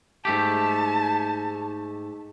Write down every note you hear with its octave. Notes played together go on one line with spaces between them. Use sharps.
G#2 A3 G4 A5